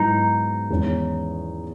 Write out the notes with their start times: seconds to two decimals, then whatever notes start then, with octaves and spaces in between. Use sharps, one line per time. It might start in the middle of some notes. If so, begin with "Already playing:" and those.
Already playing: G#2 F#3 B3 D#4 E4
0.70 E2 D#3 G#3 C#4